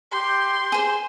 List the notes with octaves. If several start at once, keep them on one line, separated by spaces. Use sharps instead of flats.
G4 C6
G#4 C5